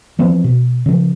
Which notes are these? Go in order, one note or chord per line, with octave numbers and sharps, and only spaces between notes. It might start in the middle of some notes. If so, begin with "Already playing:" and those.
E3 F3 B3 C4
B2
C#3 F3